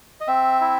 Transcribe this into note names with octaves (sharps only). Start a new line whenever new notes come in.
D#5
C4 E5
E4